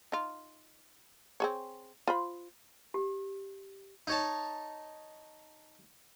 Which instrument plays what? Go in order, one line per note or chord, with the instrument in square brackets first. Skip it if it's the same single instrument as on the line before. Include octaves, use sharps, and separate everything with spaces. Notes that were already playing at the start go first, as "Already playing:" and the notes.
[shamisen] D#4 F4
C4 G#4 C#5
F4 C5 B5
[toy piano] G4
[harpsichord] D#4 C#5 A5